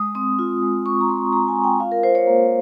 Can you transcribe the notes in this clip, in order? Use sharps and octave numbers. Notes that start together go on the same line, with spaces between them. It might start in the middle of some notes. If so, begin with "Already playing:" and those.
Already playing: G#3 D#6
C4 D#6
F4
G#3
C4 C#6
A#5
C4 C6
C6
G#3 A#5
G#5
F4
G5
F4 F5
A#4
F4 C5
C#5
A#3